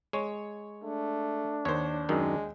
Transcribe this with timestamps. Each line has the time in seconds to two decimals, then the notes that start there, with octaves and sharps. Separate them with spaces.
0.13 G#3 C#5
0.84 A3 D4
1.65 D#2 C5 C#5
2.09 F#2 D#3 G#3 D#4